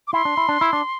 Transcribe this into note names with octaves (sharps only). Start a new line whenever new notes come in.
D6
E4 C6
D4
E4
D4
E4
D4